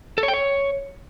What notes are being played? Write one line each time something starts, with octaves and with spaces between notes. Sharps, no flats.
A4
C#5
G5
C#5